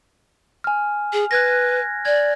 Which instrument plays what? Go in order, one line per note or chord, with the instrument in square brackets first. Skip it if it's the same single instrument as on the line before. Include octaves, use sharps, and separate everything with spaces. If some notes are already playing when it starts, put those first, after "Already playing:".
[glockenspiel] G#5 F6
[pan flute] G#4
[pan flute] B4 [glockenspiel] F#6 G#6 A#6
[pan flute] D5 [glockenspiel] G#6